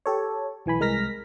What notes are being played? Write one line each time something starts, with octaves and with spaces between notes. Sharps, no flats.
G4 A4 C#5
B1 E3 G#5 B5
C2 G#3 A#4 F6 A#6 B6